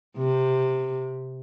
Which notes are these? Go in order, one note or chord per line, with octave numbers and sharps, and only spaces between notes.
C3